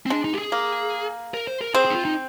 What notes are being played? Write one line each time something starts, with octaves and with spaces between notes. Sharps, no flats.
C4
G#3 D4
D#4
G4
G#4
A#3
A#4
C5
A#4
C4 G#4
G#4
D#4
F4
D#4